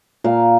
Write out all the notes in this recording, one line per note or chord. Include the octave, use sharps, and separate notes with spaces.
A#2 A#3 F5